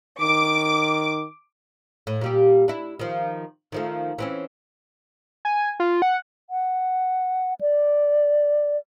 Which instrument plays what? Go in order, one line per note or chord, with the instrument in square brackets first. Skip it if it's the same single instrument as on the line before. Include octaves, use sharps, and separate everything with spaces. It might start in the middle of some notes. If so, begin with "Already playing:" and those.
[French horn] D#3 [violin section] D6
[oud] A2
A#2 G3 G4
D4 E4
D#3 F3
D#3 F3 A3
E3 C4 C#4
[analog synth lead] G#5
F4
F#5
[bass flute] F#5
D5